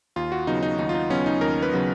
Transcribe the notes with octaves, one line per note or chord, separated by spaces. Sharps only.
D#2 F4
F#4
C#3 F#3 B3 D#4
D#4
D#2 D#4
F4
D#4
C#3 F#3 B3 C#4
D#4
D#2 A#4
B4
C#3 F#3 B3